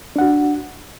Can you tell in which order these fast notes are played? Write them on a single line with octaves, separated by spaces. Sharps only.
D4 F#5 F#4